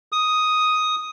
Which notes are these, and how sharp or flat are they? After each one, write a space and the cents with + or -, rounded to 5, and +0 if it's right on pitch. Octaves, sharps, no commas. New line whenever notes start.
D#6 +5